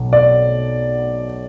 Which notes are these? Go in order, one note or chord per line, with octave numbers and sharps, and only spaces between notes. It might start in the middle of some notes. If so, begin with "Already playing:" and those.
Already playing: B1 B2 F#3
D5